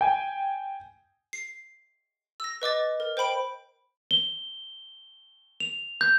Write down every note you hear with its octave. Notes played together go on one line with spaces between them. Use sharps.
G5 G#5
C7
E6 A#6
B4 D#5 D6 A6
A#4
C5 G5 B5 D7
G7
F7
G6